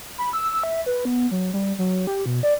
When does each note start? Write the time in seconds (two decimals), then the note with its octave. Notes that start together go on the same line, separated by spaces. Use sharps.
0.18 B5
0.33 E6
0.63 E5
0.86 B4
1.05 B3
1.31 F#3
1.54 G3
1.78 F#3
2.07 G4
2.26 B2
2.43 D5